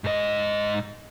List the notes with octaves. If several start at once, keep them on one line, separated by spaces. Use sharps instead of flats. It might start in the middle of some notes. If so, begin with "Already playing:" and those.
G#2 D#5